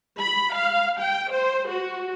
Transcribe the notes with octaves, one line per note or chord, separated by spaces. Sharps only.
B5
F5
G5
C5
F#4